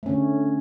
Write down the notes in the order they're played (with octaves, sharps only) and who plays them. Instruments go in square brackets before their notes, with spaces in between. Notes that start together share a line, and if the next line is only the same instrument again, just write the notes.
[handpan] A3
C#4
D3